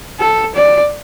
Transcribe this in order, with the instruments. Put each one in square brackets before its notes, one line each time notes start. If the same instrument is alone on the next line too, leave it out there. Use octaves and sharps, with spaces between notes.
[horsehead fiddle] A4
D5